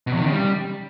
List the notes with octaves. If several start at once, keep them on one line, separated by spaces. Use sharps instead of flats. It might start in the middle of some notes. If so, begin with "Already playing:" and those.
B2
E2
D#3
C#3
G3